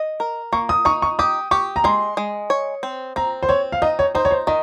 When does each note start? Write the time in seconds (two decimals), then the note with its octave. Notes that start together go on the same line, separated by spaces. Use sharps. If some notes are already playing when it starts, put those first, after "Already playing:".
Already playing: D#5
0.20 A#4
0.53 A#3 C#6
0.69 D#6
0.85 D#4 C#6
1.02 C#6
1.19 G4 D#6
1.51 G4 C#6
1.76 A#5
1.84 G#3 C6
2.17 G#3
2.50 C#5
2.83 C4
3.16 C4 A#5
3.43 C5
3.49 C4 C#5
3.72 F5
3.82 D#4 D#5
3.99 C#5
4.15 D#4 C5
4.25 C#5
4.31 C5
4.47 D#3 D#5